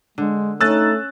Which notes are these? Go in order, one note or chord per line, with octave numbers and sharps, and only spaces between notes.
D3 G#3
A3 C#4 D#4 E6 F#6 A6